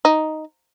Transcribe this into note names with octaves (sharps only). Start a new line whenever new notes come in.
D#4